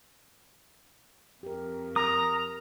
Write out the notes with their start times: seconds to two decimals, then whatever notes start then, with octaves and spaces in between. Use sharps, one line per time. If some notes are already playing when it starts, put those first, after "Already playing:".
1.43 F2 G4 A#4
1.96 A#4 A#5 D#6